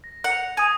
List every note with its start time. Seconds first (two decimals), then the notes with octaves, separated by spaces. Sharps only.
0.04 A#6
0.24 F#5
0.31 F7
0.57 G#5 D#6